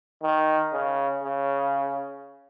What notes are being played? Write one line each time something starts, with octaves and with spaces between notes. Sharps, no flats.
D#3
C#3
C#3